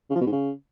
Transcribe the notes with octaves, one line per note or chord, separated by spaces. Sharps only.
C#3
F3
B2
G#2
C#3